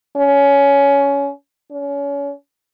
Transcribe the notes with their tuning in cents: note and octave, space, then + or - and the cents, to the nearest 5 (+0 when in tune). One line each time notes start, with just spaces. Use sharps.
C#4 +20
C#4 +30